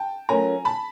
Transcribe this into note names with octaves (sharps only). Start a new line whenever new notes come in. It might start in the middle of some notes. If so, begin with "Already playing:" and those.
Already playing: G5 A5
F#3 A3 C#4 F4 A#4 G#5 A#5
A5 B5